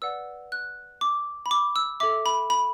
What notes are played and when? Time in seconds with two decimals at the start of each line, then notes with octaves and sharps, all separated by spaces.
0.02 B4 D5 F#5 E6
0.52 F#6
1.01 D6
1.46 B5
1.51 D6
1.76 E6
2.00 A4 E5 D6
2.26 B5
2.50 B5